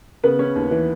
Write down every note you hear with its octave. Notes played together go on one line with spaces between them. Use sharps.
C#3 B3 B4
C#4
D#2
E3